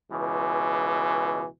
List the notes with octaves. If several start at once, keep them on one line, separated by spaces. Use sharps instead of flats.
C#2 B2 E3